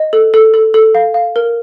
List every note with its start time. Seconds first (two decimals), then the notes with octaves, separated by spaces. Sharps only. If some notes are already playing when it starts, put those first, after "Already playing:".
Already playing: D#5
0.13 A4
0.34 A4
0.54 A4
0.74 A4
0.95 F5
1.14 F5
1.36 A#4